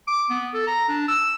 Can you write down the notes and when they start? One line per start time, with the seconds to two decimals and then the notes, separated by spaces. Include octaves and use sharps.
0.08 D6
0.30 B3
0.54 A4
0.67 A#5
0.89 D4
1.08 E6